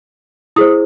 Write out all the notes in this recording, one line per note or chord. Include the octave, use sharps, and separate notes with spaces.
E4 G#4 C5 D#6